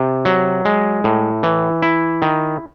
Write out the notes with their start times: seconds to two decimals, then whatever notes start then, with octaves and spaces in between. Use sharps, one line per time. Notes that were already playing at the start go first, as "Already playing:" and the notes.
Already playing: C3
0.25 F#3
0.65 G#3
1.04 A2
1.43 E3
1.82 E4
2.22 D#3